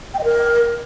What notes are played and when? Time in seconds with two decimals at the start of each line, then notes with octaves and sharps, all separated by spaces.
0.14 G5
0.19 D#5
0.24 A#4